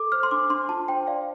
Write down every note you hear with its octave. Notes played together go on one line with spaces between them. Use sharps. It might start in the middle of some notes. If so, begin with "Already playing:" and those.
Already playing: A4 D6
C5 F6
C6
D4 D6
D4 C6
F4 A5
C5 G5
D5 F5